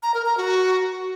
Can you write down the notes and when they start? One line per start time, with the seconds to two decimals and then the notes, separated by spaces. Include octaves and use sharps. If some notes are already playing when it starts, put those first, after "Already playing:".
0.03 A#5
0.14 A#4
0.26 A#5
0.37 F#4